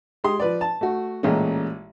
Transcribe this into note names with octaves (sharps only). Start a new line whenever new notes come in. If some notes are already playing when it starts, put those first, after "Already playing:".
G#3 G4 C6 D#6
F3 B4 D5
A5
A3 F#4
A1 A#2 G#3 C#4